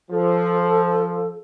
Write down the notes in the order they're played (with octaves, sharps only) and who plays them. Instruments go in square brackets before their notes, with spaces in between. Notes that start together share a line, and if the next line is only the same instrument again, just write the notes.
[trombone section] F3 [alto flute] A4